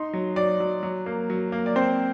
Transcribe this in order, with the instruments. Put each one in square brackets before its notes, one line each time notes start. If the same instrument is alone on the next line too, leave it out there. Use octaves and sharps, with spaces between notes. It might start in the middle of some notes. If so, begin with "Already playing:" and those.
Already playing: [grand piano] D#4 C6
F#3
F#3 D5
F#3
F#3
A#3
F#3
A#3
D5
C4 C5